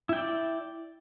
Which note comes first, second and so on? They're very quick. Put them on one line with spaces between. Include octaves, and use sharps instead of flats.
E4 G5 D5